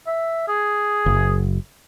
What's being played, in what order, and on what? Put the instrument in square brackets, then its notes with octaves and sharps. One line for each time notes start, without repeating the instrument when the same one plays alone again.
[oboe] E5
G#4
[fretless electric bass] F#1